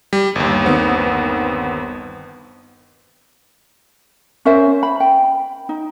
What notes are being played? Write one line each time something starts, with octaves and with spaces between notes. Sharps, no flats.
G3
G1 D#2
D#3 B3 C4
C#4 A#4 C5 E5
B5
G5
D#4